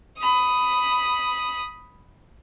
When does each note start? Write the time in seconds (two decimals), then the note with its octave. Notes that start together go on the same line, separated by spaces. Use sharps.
0.17 B5 D#6